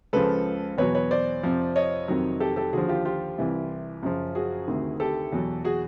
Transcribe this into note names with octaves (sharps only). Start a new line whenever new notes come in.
C#2 C#3 F3 A4 B4
E2 B2 F#3 B4 C#5
B4 C#5
C5 D5
F2 C3 F3
C#5 D#5
F2 C3 D#3 F#3
G4 A4
G4 A4
D#2 D3 F3 F#4 G#4
F4 G4
F4 G4
C2 C3 E3
F#2 C#3 F3
F#4 G#4
D2 C3 D#3
G4 A4
E2 B2 F#3
F#4 G#4